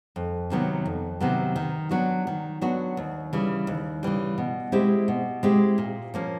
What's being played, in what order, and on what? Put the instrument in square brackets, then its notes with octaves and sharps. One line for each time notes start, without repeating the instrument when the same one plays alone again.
[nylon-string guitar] F2
C3 D#3 F#3 B3
F2
C3 D#3 F#3 B3
D#3
F#3 B3 D4 F#4
D#3
F#3 B3 D4 F#4
D#2
C#3 E3 G3
D#2
C#3 E3 G3
B2
G#3 C4 E4 G4
B2
G#3 C4 E4 G4
A#2
F3 A#3 C#4